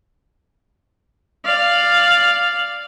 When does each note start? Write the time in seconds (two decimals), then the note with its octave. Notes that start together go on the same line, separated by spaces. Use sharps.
1.45 D5 F5